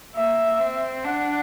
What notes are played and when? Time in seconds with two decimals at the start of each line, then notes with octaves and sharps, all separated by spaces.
0.15 A#3 E5
0.60 C4
1.04 D4 F#5